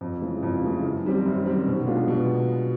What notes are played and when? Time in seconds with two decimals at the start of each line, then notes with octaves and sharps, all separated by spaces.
0.01 F2
0.21 C#3 E3 G#3
0.43 F2
0.63 C#3 E3 G#3
0.83 F#2
1.04 D#3 G3 C4
1.25 F#2
1.46 D#3 G3 C4
1.66 B2
1.87 G#3 B3 D4 F4
2.08 B2